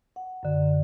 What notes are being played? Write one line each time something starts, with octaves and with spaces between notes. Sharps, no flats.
F#5
F#2 D3